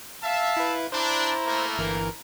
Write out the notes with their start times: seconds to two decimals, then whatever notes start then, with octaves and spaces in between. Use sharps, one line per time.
0.23 E5 F5 A5
0.57 E4 B4
0.92 D4 E4 C5 A#5
1.47 A3 A#3
1.78 G1 E3 A#4